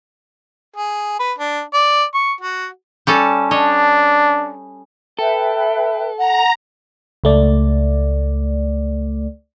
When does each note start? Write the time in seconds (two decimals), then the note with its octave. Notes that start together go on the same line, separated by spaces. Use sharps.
0.77 G#4
1.20 B4
1.39 D4
1.74 D5
2.15 C#6
2.41 F#4
3.07 G3 C#4 A4
3.51 D4 C#5 D#5
5.19 A4 B4 E5 G5
6.19 F#5 A#5
7.24 C#2 A3 D5